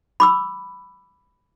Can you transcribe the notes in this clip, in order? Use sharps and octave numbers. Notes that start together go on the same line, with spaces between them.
B5 D6 E6